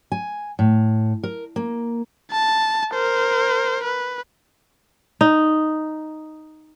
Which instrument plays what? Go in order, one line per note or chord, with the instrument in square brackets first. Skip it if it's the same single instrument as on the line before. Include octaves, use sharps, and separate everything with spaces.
[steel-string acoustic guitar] G#5
A2
A#4
A#3
[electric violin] A5
A#4 C5
B4
[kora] D#4